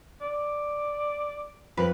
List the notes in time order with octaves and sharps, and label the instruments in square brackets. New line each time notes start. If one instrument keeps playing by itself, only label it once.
[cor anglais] D5
[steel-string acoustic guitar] F2 [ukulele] B4